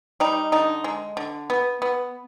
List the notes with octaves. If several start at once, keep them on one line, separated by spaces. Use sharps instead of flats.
G3 D#4
D3 D#4
G#3
D3
B3
B3